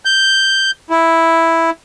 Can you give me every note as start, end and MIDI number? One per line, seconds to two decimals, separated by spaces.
0.05 0.71 91
0.90 1.70 64